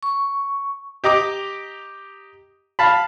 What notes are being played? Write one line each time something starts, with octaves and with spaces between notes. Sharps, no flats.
C#6
G4 D#5 A#5 D6
F5 A5 B5